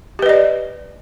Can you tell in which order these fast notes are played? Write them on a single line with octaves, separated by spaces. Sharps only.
G4 B4 D#5 D5